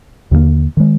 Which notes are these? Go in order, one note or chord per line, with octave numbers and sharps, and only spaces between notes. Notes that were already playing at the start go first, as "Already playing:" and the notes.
D#2 D3 G3 A#3
D#3 G#3